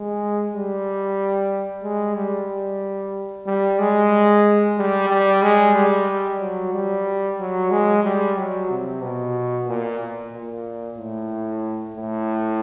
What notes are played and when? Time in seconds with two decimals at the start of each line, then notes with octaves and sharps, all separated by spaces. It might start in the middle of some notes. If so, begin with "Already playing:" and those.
Already playing: G#3
0.52 G3
1.83 G#3
2.15 G3
3.47 G3
3.79 G#3
4.77 G3
5.09 G3
5.42 G#3
5.75 G3
6.40 F#3
6.73 G3
7.39 F#3
7.71 G#3
8.04 G3
8.37 F#3
8.70 C3
9.02 B2
9.68 A#2
10.33 A#2
10.99 A2
11.97 A2